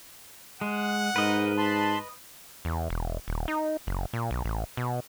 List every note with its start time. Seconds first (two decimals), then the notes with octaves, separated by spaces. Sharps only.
0.61 G#3 F#5
1.16 G#2 G#3 D#4 A#4 B4 D#5
1.58 A5 B5 C6
2.65 E2
2.90 E1
3.28 D#1
3.48 D#4
3.87 F#1
4.13 A#2
4.31 B1
4.45 A1
4.77 B2